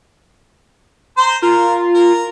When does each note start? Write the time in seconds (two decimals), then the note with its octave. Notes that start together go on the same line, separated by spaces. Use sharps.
1.17 C5 A#5 C6
1.42 F4 A#4
1.95 A#4 A#5